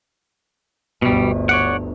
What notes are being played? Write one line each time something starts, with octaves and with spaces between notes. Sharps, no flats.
G1 D2 B2 G3
C#5 D5 F#5